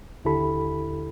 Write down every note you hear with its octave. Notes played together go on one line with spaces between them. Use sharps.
D#2 D3 E4 G4 A4 B5